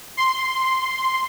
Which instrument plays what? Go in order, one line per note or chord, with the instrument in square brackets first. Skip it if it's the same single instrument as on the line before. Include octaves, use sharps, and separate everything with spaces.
[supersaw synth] C6